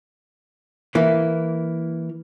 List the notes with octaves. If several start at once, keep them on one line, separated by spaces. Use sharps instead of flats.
E3 A#3